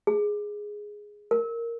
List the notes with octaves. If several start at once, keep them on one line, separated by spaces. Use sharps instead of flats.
G#4
A#4